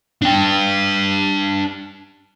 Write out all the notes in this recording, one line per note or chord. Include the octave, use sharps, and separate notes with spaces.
D4 G5